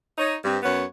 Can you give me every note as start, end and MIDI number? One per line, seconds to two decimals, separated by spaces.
0.18 0.35 63
0.18 0.35 73
0.44 0.58 43
0.44 0.58 60
0.63 0.84 42
0.63 0.84 59
0.63 0.84 73
0.63 0.84 78